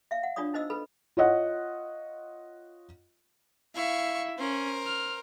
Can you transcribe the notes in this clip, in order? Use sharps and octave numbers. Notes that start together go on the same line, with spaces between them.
E5 F5
F#5
D4 F4 C#5 D5 D#6
D#4 C5 D#5 E6
A4 B4 B5
F4 C#5 D#5 F#5
E4 E5 F5 C#6
C#4 A#4 C5
F6